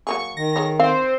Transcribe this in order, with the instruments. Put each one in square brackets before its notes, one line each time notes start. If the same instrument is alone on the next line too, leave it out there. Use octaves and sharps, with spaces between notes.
[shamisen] F#3 A#3 G#4 [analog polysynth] C#6
[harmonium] D#3 [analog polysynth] A#6
[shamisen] G#4 A#4 C#5
[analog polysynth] C4 C5 [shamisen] F5